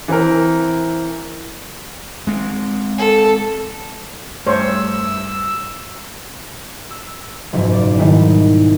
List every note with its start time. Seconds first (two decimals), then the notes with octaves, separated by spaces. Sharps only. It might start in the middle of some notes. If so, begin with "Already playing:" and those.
0.08 E3 C4 A#4
2.27 G#3 C4
2.98 A4
4.47 G2 A3 C5 C#5 E6
6.90 E6
7.53 F#1 G#2 B2 F3
7.73 D5 D6
7.98 G#2 D#3 G3 B3 E4